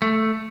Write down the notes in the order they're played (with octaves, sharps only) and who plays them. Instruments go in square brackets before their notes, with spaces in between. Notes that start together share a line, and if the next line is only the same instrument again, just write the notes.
[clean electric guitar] A3